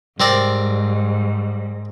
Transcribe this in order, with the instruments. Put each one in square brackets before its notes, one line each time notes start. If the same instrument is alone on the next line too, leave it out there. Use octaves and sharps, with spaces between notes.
[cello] G#2 [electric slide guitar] G3 [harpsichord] C4 A#4 D5